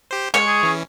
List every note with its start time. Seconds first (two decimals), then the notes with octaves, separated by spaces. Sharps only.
0.11 G4 C5
0.34 G#3 C#5
0.47 G#4
0.63 E3 C#4